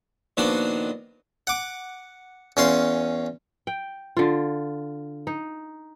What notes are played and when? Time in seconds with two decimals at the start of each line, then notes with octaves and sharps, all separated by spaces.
0.37 A#2 D#3 F3 B3 D4 F#4
1.47 F#5 D6
2.57 E2 C#4 F5 C6
3.67 G5
4.17 D3 F4
5.27 D#4